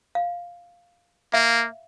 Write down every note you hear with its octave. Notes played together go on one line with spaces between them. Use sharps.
F5
A#3 E5 F5